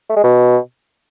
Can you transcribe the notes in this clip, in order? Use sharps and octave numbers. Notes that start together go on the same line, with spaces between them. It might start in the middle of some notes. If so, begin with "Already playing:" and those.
A3
G#3
B2